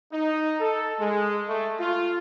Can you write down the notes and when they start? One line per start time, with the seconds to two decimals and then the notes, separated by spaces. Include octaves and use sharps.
0.12 D#4
0.60 A4
0.99 G#3
1.48 A3
1.80 F4